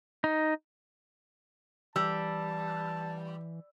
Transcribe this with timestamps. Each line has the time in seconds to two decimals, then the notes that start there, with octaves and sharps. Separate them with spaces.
0.24 D#4
1.96 E3 G3 A5 E6